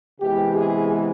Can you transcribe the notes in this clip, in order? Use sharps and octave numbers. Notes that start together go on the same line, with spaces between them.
C3 E3 G#3 B3 G4
G#4